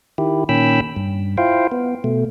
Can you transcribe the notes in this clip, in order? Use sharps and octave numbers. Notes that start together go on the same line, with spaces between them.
D#3 E4 G4
A#2 D#3 C#4 G5 B5 E6
G2
E4 F4 C5 F5 G5
B3
B2 A3